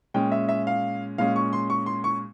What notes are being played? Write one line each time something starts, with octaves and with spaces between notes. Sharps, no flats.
A#2 G#3 C#4 G5
E5
E5
F5
A#2 G#3 C#4 F5
C#6
C6
C#6
C6
C#6